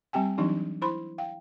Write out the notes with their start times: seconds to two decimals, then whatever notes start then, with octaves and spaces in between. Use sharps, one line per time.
0.13 G3 C4 G4 G5 G#5
0.38 E3 F#3 C4 D4 D#4 G4
0.82 E4 C5 B5 C6
1.18 F5 G5